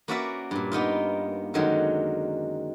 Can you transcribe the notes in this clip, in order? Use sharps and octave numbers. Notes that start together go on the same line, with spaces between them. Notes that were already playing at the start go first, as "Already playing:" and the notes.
A#3 C#4 F#4 B4 D5 E5
G2 A#2
A#3 B3 D#4 F4
F#2 D3 D#3 F#3 G#3